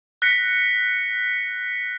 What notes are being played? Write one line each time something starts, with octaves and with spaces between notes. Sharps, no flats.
F#6 A#6 B6 C#7